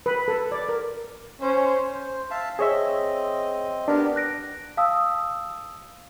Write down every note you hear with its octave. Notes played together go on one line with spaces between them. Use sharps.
B4
A4
D5
A#4
C#4 C5
C5
E5 F5 A5
C4 G#4 C#5 D#5 E5
B3 D4 G4 A#4
F#6 A#6 D7
F5 A5 D#6 E6